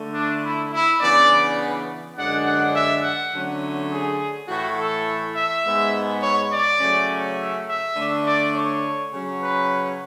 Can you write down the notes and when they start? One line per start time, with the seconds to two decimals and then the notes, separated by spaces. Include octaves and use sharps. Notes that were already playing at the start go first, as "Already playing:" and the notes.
Already playing: D3 A3
0.14 D4
0.43 E4
0.72 E4
1.00 C#3 E3 B3 D4 D5
2.16 F#2 D3 G#3 D4 F#5
2.45 F#5
2.75 E5
3.03 F#5
3.33 D3 F#3 A3 C#4
3.90 G#4
4.48 A2 E3 A3 F#4
4.77 A4
5.36 E5
5.64 G#2 G#3 B3
6.22 C#5
6.51 D5
6.80 C#3 F#3 A3 C#4
7.38 E5
7.66 E5
7.96 D3 A3 D4
8.25 D5
8.54 C#5
9.12 C#3 F#3 C#4
9.41 B4